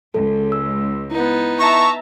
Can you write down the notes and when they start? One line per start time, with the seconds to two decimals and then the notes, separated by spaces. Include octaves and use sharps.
0.14 C#2 A4
0.52 E6
1.11 B3 D#4 E4
1.59 E5 A5 A#5 C#6